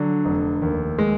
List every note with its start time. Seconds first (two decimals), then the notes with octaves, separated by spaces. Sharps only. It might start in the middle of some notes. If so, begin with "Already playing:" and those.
Already playing: D3 F#3
0.25 F1
0.62 D#2
0.98 G#3